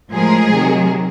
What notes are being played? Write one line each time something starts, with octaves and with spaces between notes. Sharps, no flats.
A2 F3 G#3 G#4 A#4
C3 D#3 F#3